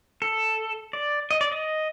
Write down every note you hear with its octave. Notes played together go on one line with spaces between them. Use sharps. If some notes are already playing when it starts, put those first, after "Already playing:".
A4
D5
D#5
D5
D#5